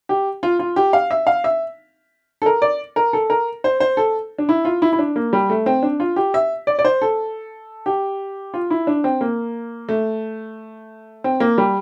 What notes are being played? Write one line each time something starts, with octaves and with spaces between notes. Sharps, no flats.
G4
F4
F4
G4
F5
E5
F5
E5
A4
A#4
D5
A#4
A4
A#4
C5
C5
A4
D4
E4
F4
E4
E4
D4
A#3
G3
A3
C4
D4
F4
G4
E5
D5
D5
C5
A4
G4
F4
E4
D4
C4
A#3
A3
C4
A#3
G3